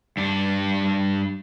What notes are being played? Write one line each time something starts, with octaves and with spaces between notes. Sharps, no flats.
G2 D4